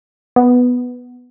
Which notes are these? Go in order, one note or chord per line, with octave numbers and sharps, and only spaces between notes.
B3